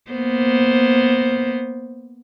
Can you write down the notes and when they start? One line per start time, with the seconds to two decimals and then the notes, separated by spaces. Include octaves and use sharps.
0.11 A#3 B3 C5